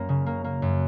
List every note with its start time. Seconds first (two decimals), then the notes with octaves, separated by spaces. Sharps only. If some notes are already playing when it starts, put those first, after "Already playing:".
Already playing: F#2 A#3
0.09 C#3
0.26 A#3
0.44 A#3
0.62 F#2